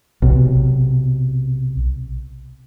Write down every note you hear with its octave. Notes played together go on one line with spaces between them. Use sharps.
B1 C3